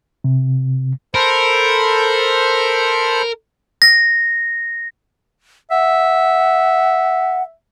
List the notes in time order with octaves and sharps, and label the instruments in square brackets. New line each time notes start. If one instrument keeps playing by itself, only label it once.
[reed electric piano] C3
[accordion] A4 C5 B5 [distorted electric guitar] A#4
[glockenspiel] A#6
[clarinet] E5 [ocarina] F#5